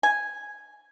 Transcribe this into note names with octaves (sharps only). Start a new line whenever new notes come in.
G#5